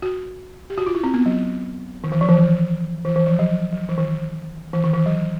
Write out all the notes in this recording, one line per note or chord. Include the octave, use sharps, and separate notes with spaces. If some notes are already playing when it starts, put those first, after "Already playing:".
F#4
G4
F#4
F4
E4
C4
B3
F#3
D#3
E3
F3
E3
D#3
E3
E3
F3
F#3
F#3
E3
D#3
E3
D#3
E3
F#3